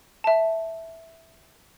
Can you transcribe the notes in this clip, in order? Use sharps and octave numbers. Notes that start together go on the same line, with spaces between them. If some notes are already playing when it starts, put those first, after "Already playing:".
E5 A5